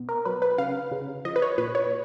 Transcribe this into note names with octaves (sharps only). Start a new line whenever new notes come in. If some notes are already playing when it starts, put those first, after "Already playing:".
Already playing: B2
A#4
F#3 B4
B4
C#3 F5
C#3
F3 D#5
B4
C#5
A#2 B4
C#5